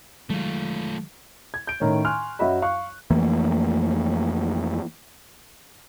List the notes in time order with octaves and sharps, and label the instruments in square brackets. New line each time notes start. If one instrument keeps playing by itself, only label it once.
[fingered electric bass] D#3 F#3 G#3 [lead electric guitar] A3 F4
[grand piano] G#6
G6 D7
A2 D#3 C#4
G#5 C6 C#6 F6 F#6
F#2 F#3 F#4 D#5 E5 B5
F5 C#6 F#6
[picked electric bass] F2 E3 A3 A#3